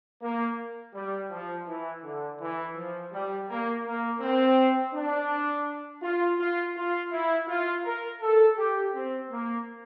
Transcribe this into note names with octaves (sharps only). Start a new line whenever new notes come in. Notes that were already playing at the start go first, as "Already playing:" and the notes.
A#3
G3
F3
E3
D3
E3
F3
G3
A#3
A#3
C4
D4
F4
F4
F4
E4
F4
A#4
A4
G4
C4
A#3